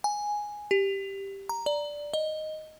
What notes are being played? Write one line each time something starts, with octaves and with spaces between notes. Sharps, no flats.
G#5
G4
A#5
D5
D#5